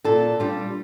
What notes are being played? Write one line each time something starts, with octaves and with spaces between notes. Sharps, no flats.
A#2 A4
G3 D4 F4